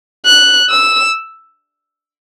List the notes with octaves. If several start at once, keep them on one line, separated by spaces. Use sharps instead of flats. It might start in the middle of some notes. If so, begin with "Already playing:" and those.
F#6
E6